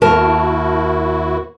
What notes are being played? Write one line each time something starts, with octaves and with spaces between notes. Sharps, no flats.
D#2 E4 F#4 A#4 A5